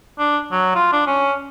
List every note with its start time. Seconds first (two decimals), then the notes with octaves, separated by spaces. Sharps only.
0.19 D4
0.52 F#3
0.75 F4
0.92 D4
1.07 C#4